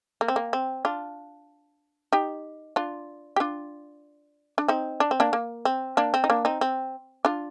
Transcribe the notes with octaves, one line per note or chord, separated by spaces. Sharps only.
A#3
C4
A#3
C4
D4 F4
D#4 G4
D4 F4
G4
D4 F4
D4
C4 D#4
D4
C4
A#3 D4
A#3
C4
A#3 D4
C4
D#4
A#3 D4
C4 D#4
C4
D4 F4